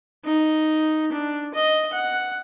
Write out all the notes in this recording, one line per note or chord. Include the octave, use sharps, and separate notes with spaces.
D#4
D4
D#5
F#5